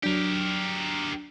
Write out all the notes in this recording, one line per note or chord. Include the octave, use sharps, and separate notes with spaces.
F#3 D4 G4 A#4